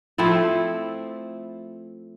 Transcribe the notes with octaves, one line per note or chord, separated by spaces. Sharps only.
F3 A3 C4 E4